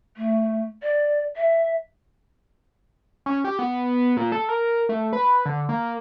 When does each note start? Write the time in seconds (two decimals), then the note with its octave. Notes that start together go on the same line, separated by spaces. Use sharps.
0.17 A3
0.83 D5
1.36 E5
3.26 C#4
3.44 G4
3.59 B3
4.17 A#2
4.32 A4
4.49 A#4
4.89 A3
5.13 B4
5.46 D3
5.69 A#3